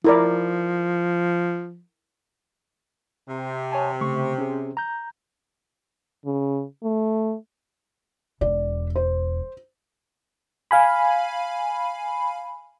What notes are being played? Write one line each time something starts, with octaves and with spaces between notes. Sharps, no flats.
F3 E4 A#4 D5
C3
C#5 G#5 A5
C#3 A3 C#6
C#4 G#4
A#5 G6
C#3
A3
E1 E2 D5
C5
F5 G#5 B5